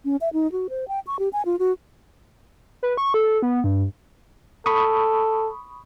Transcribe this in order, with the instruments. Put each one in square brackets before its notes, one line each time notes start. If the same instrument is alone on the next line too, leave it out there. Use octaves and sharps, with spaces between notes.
[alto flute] C#4
E5
D#4
F#4
C5
G5
C#6
G4
G#5
F4
F#4
[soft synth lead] B4
C#6
A4
B3
G2
[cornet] A4 [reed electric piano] B5 C#6 D#6